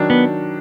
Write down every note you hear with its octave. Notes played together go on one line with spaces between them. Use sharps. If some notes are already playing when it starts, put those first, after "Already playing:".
Already playing: D#3 F#3 D4
B3